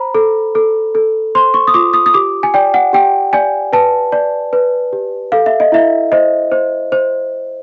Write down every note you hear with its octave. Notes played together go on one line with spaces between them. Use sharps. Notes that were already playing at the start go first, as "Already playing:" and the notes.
Already playing: C5 A#5 B5
A4
A4
A4
C5 C6
C#6
D#6
F4 D6
D#6
D#6
G4 D6
G#5
D5 G5
F#5
G4 G5
D5 G#5
B4 A5
D5
B4
G4
A4 F5
E5
D#5
E4 E5
C5 D#5
C5
C5